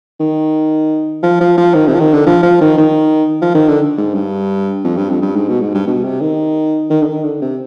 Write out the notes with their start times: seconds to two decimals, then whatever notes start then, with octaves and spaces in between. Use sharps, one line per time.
0.20 D#3
1.23 F3
1.40 F3
1.58 F3
1.75 D#3
1.88 C3
1.94 F3
2.00 D#3
2.14 D3
2.26 F3
2.43 F3
2.61 D#3
2.78 D#3
3.42 F3
3.55 D#3
3.68 D3
3.98 G#2
4.15 G2
4.84 F2
4.97 G2
5.10 F2
5.22 G2
5.36 G#2
5.49 B2
5.61 G#2
5.75 G2
5.87 B2
6.04 C3
6.21 D#3
6.90 D#3
7.02 D3
7.07 D#3
7.24 D3
7.42 C3